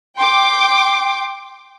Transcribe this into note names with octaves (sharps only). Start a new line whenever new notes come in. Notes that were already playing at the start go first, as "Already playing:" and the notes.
G5 C6 D6